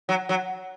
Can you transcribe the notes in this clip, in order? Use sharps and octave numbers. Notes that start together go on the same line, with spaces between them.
F#3
F#3